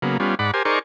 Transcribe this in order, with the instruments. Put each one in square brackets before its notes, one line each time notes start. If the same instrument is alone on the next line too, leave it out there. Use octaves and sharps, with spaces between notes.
[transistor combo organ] C#3 F#3 A#3 B3
G3 B3 C#4 F4
G#2 D5 F#5 B5
G4 A#4 C5 G#5
D#4 G#4 A#4 C5 D5 C#6